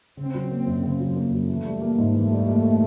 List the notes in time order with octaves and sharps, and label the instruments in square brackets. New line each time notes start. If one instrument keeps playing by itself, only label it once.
[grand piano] C#3 [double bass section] C4
[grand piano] F#3
A#3
F#2
[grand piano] C#3 [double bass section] C4
[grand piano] F#3
A#3
F#2
[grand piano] E3 [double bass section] A3
[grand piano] G3
A#3
G#2
[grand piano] E3 [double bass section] A3
[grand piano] G3
A#3